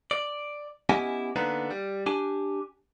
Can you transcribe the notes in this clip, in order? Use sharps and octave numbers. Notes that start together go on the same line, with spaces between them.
D5
B3 C#4 E4 G4 D#5 G#5
D3 A#3 B3 D4 D#4 B4
G3
D4 G4 G#5